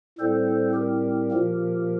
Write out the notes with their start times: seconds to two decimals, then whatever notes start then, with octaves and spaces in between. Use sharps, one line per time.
0.18 A2 G3 C4 A4 C5
0.74 G4 A#4
1.31 A#2 F3 A#3